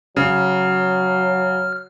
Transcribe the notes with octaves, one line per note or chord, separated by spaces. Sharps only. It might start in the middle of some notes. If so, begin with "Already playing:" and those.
C#3 F#3 F6